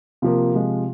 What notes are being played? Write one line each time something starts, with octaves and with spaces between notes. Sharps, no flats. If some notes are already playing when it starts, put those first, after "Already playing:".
C3 F3 A#3 F4
C3 F3 G#3